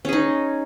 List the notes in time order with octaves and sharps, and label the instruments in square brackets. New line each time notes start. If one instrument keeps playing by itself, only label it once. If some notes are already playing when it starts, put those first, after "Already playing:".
[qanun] C#4
G#4
D#4